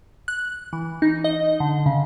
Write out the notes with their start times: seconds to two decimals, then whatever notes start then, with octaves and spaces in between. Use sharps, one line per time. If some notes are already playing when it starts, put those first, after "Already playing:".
0.28 F#6
0.73 E3
1.02 D#4
1.24 D#5
1.60 D3
1.86 C#3